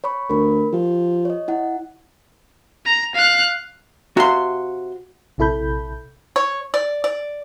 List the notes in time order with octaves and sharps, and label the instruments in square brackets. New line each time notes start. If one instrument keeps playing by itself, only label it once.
[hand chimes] C#5 B5 C#6
[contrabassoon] D2 [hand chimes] A#4 B5
[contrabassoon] F3 [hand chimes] G4
[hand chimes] C#5 D#5
E4 F#5
[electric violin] A#5
F5 F#6
[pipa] C3 C6 [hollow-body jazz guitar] F#4 F5
[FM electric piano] A#1 C3 E4 A4 B5 G6
[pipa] C#5
D5
D5